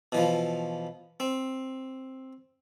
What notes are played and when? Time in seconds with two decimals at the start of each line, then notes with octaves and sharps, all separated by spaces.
0.12 B2 E3 F3
1.20 C4